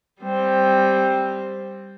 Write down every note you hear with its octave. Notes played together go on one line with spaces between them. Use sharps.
G3 C4